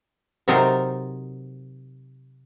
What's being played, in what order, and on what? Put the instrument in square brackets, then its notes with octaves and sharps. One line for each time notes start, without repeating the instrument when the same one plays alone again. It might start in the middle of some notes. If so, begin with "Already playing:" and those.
[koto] C3 F#3 D#4 A4 A#4 C5